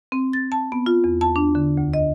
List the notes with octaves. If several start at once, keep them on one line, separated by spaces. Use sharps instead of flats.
C4
A6
A5
B3
F4
E2
A5
D4
D3
D2
D#5